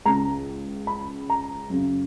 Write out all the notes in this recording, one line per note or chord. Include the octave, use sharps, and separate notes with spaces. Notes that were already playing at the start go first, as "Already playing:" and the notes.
C#2 C#3 A#5
B5
A#5
F#2 C#3